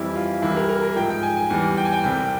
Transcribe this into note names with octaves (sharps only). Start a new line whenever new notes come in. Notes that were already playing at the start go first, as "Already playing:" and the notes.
Already playing: F2 E3 G3 E4
F4
C2 C3 E3 G3 E4
A#4
A#4
A#4
G#2 F3 G5
G5
G#5
G#5
E2 E3 G3 G#5
G5
G#5
G5
C2 C3 G3 G5